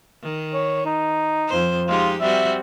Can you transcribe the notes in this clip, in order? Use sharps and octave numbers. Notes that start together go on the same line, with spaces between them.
D#3
C#5
D#4
F2 C5
G#3 D#4 F4 G4
G3 C4 F#4 E5